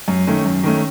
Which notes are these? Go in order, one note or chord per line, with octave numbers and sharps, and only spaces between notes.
F#2
D#3 A3 C#4
F#2
D#3 A3 C#4